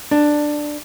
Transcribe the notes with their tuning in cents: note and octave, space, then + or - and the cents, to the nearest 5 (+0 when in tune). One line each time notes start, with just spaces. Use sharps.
D4 +10